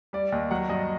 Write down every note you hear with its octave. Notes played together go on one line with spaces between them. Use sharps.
G3 D5
D#2 D#5
F#3 F#5
G2 D#5